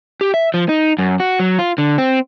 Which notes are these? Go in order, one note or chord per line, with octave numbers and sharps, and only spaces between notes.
G4
E5
F3
D#4
F#2
F#4
F#3
F4
D3
C4